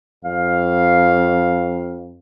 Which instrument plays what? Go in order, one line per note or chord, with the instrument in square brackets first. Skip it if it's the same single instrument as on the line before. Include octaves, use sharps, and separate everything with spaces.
[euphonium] F2 [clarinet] F5